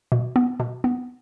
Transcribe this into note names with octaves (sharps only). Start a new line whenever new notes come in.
B2
B3
B2
B3